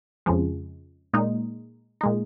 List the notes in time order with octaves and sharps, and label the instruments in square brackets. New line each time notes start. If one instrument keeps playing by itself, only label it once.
[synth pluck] F2 C#3 F3 G#3
A#2 G#3 D#4
A#2 G#3 D#4